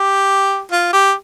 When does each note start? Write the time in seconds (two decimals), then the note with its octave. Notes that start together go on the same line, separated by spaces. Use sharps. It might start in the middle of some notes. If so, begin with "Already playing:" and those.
Already playing: G4
0.72 F4
0.93 G4